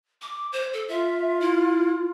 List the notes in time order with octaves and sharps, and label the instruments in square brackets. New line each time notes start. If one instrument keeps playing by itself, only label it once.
[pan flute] D6
C5
A4
[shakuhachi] F4 [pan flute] E5
[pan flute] E4